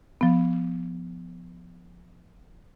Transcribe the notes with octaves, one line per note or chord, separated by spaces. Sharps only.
F3 B3